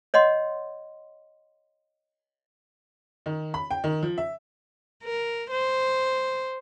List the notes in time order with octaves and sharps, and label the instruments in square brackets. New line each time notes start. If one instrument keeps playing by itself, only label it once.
[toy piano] C#5 D#5 F#5 C6
[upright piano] D#3
B5
G5
D#3
F3
E5
[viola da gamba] A#4
C5